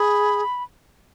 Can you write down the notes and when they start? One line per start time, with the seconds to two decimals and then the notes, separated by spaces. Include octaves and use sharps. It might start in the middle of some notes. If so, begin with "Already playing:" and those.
Already playing: G#4 B5